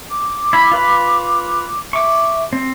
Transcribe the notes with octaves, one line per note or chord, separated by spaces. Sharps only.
D6
E4 B5
F4 B4 B5
E5 C#6 D6
C4